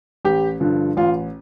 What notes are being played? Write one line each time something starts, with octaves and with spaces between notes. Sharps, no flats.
A1 G4
G2 D3 F3
A1 F4